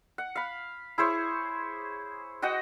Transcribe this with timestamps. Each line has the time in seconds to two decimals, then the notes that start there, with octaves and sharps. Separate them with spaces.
0.18 F#5
0.36 F5 B5
0.98 E4 G#4 C5 C#5
2.42 F#4 D#5 F#5 G5